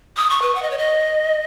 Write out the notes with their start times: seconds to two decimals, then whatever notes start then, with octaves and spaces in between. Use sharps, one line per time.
0.17 D#6
0.30 C#6
0.42 B4
0.55 F#5
0.62 D#5
0.71 C#5
0.78 D#5